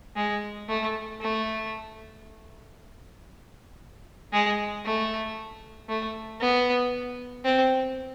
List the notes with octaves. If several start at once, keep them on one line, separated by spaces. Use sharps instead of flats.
G#3
A3
A3
G#3
A3
A3
B3
C4